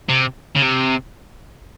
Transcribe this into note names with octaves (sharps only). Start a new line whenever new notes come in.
C3
C#3
C3